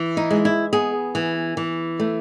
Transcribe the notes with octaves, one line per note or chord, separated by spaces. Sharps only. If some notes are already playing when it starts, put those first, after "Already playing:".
Already playing: E3
D#4
G#3
E4
B3 G#4
E3
E3
A3